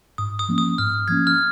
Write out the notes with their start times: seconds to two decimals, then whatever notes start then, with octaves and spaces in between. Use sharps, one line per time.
0.18 G#2 D#6
0.39 D#6
0.49 F3 A#3 C#4
0.58 D#6
0.78 G#2 F6
1.08 F3 A#3 C#4 G#6
1.27 F6